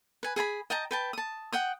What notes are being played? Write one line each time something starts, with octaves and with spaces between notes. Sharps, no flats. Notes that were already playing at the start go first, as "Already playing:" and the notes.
B4 G#5
G#4 G#5 A5 B5
D#5 G5 A5 A#5
B4 G5 A5
A5 D#6
F#5 G5 D#6